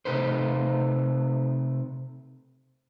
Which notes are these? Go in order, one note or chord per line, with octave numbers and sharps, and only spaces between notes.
C3 A3 D#4 B4 C5